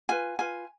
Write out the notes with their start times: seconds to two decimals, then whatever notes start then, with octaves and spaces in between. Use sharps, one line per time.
0.09 F4 B4 G#5
0.39 F4 B4 G#5